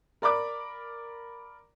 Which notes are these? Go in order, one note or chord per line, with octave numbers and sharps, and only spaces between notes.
A#4 D5 B5 D6